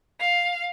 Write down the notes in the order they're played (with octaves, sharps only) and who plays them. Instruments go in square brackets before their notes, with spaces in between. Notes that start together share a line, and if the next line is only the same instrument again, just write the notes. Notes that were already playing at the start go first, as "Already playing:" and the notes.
[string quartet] F5